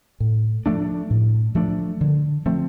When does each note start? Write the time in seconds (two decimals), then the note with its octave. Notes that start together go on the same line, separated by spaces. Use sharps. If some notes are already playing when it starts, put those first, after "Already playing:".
0.20 A2
0.66 F3 A3 D4
1.10 A2
1.55 F3 A3 D4
2.01 D3
2.46 F3 A3 C4